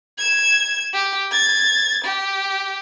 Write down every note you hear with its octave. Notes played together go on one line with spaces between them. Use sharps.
G#6 E7
G4
G#6 A6
G4